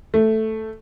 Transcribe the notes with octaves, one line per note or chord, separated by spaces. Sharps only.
A3